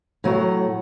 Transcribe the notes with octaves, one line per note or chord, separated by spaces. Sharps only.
A2 F#3 F#5 A#5